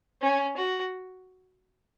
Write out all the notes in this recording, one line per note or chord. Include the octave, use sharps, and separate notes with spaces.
C#4
F#4